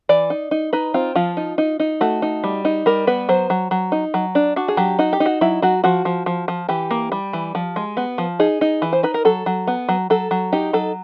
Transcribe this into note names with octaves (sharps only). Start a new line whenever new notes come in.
E3 D5
D#4
D#4
D#4 B4
C4 F4
F3 F4
D#4
D#4
D#4
A3 F#4
D#4
G3
D#4
G3 A#4
B3 B4
F#3 C5
F#3
F#3
D#4
F#3
D4
D4 F#4
G#4
F#3 G4
D#4 F#4
G4
D#4
F#4
F#3 E4
F#3 F#4
F3 F#4
F3
F3
F3
E3 G4
A#3
G3
E3
F3
G#3
B3
F3
D#4 G#4
D#4
E3
C5
D#4 B4
A#4
F#3 A4
F#3
B3
F#3
F#3 A4
F#3
D#4 G4
F#3 A4